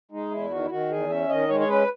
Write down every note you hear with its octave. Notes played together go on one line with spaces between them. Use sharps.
G#3 D#4
E2 E4
D#3 F#4
E4
D#3 F#4
E2 G#4
C#4 E5
D#3 D#5
G#3 C#5
C#5
C#4 B4